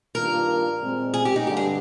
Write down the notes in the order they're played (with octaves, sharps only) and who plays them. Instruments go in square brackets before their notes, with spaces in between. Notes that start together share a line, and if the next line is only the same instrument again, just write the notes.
[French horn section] G2 D#3 A#3 D4 F4 [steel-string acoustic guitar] A#4
[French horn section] A#2 G#3 C4
[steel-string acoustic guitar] G#4
G4
D#4
[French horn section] G2 D3 G3 [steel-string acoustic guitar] G4
[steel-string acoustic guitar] G#4